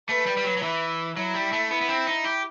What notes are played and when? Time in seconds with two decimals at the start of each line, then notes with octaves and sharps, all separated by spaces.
0.09 A3 B4
0.27 G3
0.37 G3
0.44 F#3
0.57 F#3
0.63 E3 E4
1.17 F#3 E4
1.34 G3
1.53 A3
1.70 B3 E4
1.81 B3
1.89 C4
2.07 D#4
2.25 G4